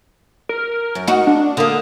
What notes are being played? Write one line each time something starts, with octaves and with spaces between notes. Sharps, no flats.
A#4
F#2
D#4 F#4
D4
D3 A#3 D#6